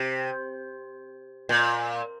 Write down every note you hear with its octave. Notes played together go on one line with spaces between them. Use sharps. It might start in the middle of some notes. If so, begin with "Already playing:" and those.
Already playing: C3
A#2